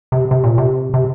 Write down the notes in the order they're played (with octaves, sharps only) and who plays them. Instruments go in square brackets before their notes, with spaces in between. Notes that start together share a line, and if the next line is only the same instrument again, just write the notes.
[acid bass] C3
C3
A#2
C3
C3